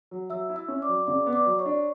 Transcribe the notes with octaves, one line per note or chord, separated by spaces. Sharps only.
F#3
F#3 E5 E6
E4
E5 E6
C#4
D5 D6
F#3
C#3 D5 D6
B3
D5 D6
F#3
C#5 C#6
D4